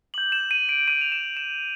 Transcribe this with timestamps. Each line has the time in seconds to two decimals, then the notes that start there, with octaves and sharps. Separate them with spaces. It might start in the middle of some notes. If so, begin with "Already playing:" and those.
0.14 D6 G6 F#7
0.32 E7
0.51 D#7
0.69 D7
0.87 D6 G6 D#7
1.01 F7
1.12 E7
1.37 E7